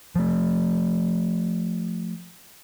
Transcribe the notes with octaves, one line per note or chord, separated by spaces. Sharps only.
F3 A3